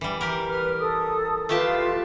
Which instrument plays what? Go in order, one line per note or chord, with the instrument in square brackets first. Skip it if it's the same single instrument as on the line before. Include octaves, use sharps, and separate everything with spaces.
[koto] E3 G3
G4 A#4
[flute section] B4 F6
A4 D#6
[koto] A3 G4 A5 [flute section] F4 B4 F5